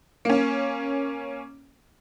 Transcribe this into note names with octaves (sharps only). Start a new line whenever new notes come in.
A#3 C#4